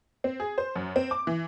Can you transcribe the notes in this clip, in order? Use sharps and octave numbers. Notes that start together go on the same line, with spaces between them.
C4
G#4
C5
F#2
C4
D6
E3